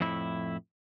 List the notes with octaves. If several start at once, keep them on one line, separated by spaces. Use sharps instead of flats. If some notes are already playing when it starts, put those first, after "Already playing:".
F2 A2 E4